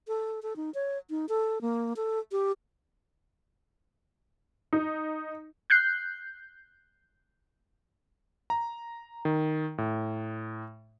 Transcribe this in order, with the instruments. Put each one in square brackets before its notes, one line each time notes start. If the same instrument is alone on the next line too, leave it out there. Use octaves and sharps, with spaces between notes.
[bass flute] A4
A4
D#4
C#5
D#4
A4
A#3
A4
G4
[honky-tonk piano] D#4
[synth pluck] F#6 G6 C7
[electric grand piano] A#5
D#3
A2